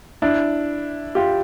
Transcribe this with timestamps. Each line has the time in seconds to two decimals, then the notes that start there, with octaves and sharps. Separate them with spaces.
0.22 D4 E4
1.15 F4 G4